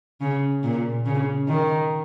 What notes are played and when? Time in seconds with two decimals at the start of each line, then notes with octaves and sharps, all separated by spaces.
0.21 C#3
0.63 A#2
1.06 C#3
1.48 D#3